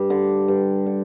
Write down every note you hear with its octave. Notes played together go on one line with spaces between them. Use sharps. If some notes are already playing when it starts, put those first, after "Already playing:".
Already playing: G2
D3
G2
D3